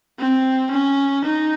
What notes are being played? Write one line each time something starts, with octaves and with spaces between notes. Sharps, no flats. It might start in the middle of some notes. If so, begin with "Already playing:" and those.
C4
C#4
D#4